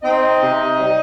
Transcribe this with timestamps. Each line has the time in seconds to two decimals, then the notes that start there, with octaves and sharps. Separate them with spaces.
0.03 C4 D#4 D#5
0.42 C3
0.80 G3